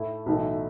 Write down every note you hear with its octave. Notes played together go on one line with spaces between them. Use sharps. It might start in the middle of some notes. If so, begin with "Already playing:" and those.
Already playing: A2 A3 E4
B1 A2 E3 A3